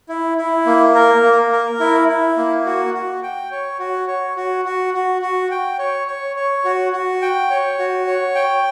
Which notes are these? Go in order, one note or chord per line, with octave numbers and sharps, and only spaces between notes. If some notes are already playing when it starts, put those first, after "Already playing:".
E4
E4
A#3
A#4
A#3
A#4
E4
E4
A#3
F#4
F#4
G5
C#5
F#4
C#5
F#4
F#4
F#4
F#4
G5
C#5
C#5
C#5
F#4
F#4
G5
C#5
F#4
C#5
G5